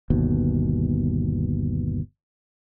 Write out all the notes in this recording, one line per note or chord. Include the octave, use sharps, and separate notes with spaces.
G1 D#2 B2